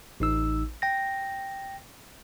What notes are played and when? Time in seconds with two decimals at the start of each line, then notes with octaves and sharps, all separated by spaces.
0.20 A1 D#4 E6
0.82 G5 A#6